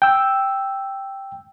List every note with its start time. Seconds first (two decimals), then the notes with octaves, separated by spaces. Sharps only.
0.02 G5 E6